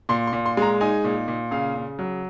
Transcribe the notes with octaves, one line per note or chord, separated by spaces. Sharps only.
A#2 C6
C6
A#2
C6
G#3 A#5
D#4 G#5
A#2
A#2
C#3 F5
C#3
F#3